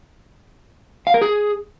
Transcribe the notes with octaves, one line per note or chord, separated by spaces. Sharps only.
F5
A#4
G#4